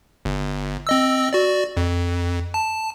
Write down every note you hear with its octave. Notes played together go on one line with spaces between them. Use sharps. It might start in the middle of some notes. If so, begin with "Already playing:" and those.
G1
C4 D#5 E6
F#4 D5
F2
A5